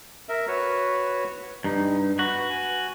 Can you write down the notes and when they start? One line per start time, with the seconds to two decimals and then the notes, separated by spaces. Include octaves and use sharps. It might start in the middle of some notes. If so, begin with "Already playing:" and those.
0.29 A#4 E5
0.48 F#4 B4 C#5
1.64 G2 D#4
2.19 F#4 B4
2.50 G#5